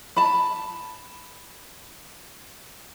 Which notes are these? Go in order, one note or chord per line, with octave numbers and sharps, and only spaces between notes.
A5 B5